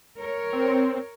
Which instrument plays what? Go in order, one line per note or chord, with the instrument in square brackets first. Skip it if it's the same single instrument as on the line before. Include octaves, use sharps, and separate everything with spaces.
[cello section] A#4 C#5
[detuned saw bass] C4